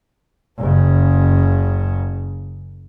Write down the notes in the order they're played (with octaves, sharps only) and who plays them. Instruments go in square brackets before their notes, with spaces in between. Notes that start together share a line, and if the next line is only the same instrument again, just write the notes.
[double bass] F#1 C#3